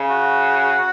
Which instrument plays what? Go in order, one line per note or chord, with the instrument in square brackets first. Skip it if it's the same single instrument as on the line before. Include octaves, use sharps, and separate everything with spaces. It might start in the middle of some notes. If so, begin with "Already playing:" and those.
Already playing: [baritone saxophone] C#3
[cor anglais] F#4